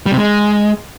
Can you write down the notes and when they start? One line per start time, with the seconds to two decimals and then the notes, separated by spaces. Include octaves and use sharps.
0.06 G3
0.12 C3
0.18 G#3